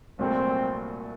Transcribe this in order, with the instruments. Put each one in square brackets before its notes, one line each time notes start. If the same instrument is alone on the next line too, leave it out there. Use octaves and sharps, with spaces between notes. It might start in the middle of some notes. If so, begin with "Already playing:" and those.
[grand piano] C2 A#2 F#3 A3 [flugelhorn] C4